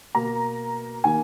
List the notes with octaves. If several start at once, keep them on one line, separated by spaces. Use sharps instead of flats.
B2 A#3 A#5
D#3 A#3 G#5